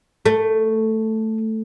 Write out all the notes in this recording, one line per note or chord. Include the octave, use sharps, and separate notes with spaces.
A3